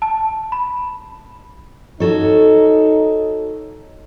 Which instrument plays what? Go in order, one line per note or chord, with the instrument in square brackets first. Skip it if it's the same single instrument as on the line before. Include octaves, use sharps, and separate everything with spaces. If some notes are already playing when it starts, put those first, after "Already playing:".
[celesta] A5
B5
[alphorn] D#4 [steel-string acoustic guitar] F#4 A4 C#5